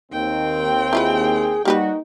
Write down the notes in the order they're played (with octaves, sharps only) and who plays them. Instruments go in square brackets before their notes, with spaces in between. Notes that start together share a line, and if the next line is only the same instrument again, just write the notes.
[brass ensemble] D#2 C4 [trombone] D#3 [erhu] G5
[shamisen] E4 F4 B4 [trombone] G#4
[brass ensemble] G3 F#4 [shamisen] A#3 G4 B4 [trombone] D#4